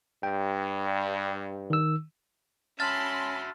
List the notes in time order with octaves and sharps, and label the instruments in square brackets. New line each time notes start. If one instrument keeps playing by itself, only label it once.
[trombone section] G2 [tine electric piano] G5
[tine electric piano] D#3 E6
[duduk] C#4 [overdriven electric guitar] F#4 E5 [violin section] A5 B5 C6 [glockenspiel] F6 A6